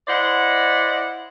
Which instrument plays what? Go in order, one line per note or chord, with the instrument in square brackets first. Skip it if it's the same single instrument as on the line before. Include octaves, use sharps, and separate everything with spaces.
[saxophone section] E4 C5 D5 D#5 F#5